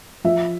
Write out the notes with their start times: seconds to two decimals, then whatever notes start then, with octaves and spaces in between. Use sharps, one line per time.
0.24 F3 E5